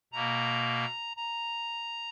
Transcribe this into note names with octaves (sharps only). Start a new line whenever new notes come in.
B2 A#3 A#5
A#5